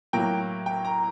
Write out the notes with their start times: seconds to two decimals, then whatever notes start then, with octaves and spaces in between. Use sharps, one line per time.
0.13 A2 F#3 A#3 G5
0.66 G5
0.85 A#5